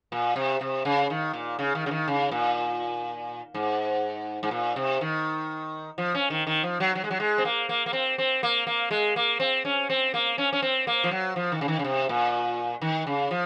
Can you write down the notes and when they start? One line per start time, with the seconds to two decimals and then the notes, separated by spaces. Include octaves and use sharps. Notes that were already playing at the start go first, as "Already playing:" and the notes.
0.12 A#2
0.36 C3
0.61 C3
0.85 C#3
1.10 D#3
1.33 A#2
1.59 C#3
1.75 D#3
1.86 C#3
1.91 D#3
2.08 C#3
2.32 A#2
3.54 G#2
4.43 G#2
4.51 A#2
4.76 C3
5.01 D#3
5.98 F3
6.14 C#4
6.30 D#3
6.47 D#3
6.63 F3
6.80 F#3
6.95 F#3
7.04 G#3
7.11 F#3
7.20 G#3
7.38 C4
7.45 A#3
7.69 A#3
7.86 A#3
7.93 C4
8.18 C4
8.43 A#3
8.67 A#3
8.91 G#3
9.16 A#3
9.40 C4
9.65 C#4
9.90 C4
10.14 A#3
10.38 C#4
10.53 C#4
10.62 C4
10.87 A#3
11.04 F3
11.11 F#3
11.36 F3
11.52 D#3
11.61 C#3
11.68 D#3
11.79 C#3
11.84 C3
12.09 A#2
12.82 D#3
13.07 C#3
13.31 F3